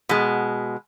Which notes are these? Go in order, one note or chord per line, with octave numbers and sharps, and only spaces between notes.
B2 G#3